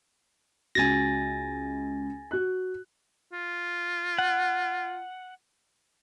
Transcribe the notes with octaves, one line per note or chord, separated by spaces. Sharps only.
C#2 F#4 G#5 A6 A#6
F#4 F#6
F4
F#5